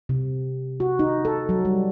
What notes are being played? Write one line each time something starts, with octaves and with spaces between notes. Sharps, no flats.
C3
F#4
D#4
A4
F#3
G3